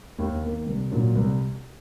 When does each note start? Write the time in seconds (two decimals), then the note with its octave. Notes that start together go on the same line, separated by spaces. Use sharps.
0.19 D#2
0.43 D#3 A#3
0.67 C2
0.92 A#2 F#3
1.15 C2